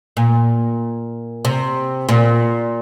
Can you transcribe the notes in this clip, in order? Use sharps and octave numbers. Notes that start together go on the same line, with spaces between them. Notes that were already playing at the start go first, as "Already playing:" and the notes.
A#2
C3
A#2